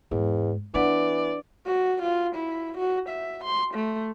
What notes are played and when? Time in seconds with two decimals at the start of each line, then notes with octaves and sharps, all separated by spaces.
0.11 E2 G#2
0.74 E3 B3 D4 B4 D5 F#5
1.66 F#4
2.02 F4
2.35 E4
2.78 F#4
3.09 E5
3.44 C6
3.74 A3